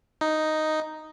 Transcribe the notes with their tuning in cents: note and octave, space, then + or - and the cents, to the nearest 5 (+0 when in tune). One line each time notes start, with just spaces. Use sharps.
D#4 +0